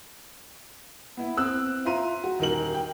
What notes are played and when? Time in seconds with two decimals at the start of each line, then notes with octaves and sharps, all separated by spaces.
1.17 B3 E4
1.37 C4 E6 F#6
1.85 F4 E5 A#5 C6 D#7
2.24 F#4
2.39 D#1 D#4 A#4 F#7
2.74 G5